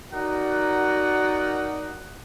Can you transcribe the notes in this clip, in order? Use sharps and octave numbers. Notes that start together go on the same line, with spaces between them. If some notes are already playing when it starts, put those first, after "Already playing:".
D#4 F#4 A#4 D5 F#5